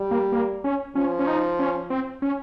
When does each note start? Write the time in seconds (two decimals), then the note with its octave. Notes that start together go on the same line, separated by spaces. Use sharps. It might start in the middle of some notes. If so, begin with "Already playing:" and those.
Already playing: G3
0.11 A#3
0.32 A#3
0.64 C#4
0.95 F3 C#4
1.19 C#4
1.27 D#4
1.59 C#4
1.90 C4
2.22 C#4